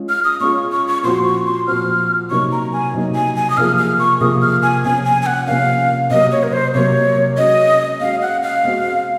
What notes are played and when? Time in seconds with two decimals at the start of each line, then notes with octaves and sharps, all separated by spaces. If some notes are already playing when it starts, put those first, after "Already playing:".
Already playing: G#3 C#4 F4 G#4
0.09 F6
0.25 D#6
0.40 G#3 C#4 F4 G#4 C#6
0.72 C#6
0.88 C#6
1.03 A#2 F3 C4 F#4 C6
1.25 C#6
1.46 C6
1.67 A#2 F3 C4 F#4 F6
2.30 C3 F#3 A#3 D#4 C#6
2.52 A#5
2.73 G#5
2.94 C3 F#3 A#3 D#4
3.15 G#5
3.36 G#5
3.50 D#6
3.57 C3 F3 A#3 F4 G#4 F6
3.78 F6
3.99 C#6
4.21 C3 F3 A#3 F4 G#4 D#6
4.42 F6
4.63 G#5
4.84 C3 F3 A#3 C#4 G#5
5.05 G#5
5.22 G#5
5.26 F#5
5.47 C3 F3 A#3 C#4 F5
6.10 C3 F#3 A#3 D#5
6.32 C#5
6.43 A#4
6.53 C5
6.74 C3 F#3 A#3 C#5
7.38 G#3 C#4 F#4 D#5
8.00 G#3 C#4 F#4 F5
8.22 F#5
8.43 F5
8.64 G#3 C4 F#4